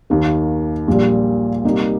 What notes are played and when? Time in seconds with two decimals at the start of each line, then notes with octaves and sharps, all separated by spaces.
0.10 D#2 D#3 A#3
0.88 A#1 A#2 G3
1.64 C3 G3 A#3 D#4 G4